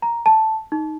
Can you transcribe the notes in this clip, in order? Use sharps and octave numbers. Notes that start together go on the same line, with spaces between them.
A#5
A5
D#4